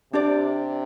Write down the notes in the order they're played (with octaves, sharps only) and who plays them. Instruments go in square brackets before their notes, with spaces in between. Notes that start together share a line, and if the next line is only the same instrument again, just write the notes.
[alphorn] C3 [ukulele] D4 G4 D5